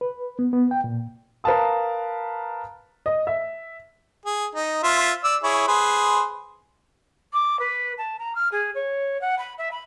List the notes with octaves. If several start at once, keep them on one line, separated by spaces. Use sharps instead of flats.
B4
B3
B3
G5
A#2
A#4 B4 F5 A5 D#6
D#5
E5
G#4
D#4
F4 C5 E5
D5 E6
E4 G#4 C#5
G#4 B4 C5
D6
B4
A5
A#5
F6
G#4
C#5
F#5
B5
E5
B5